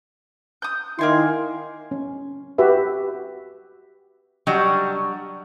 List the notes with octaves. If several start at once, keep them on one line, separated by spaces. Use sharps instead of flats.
D#6 G6
D#3 A#3 D#4 E4 G#5 C6
C#4
F#4 G4 B4 E5
F#3 G3 D4 F#4 D#5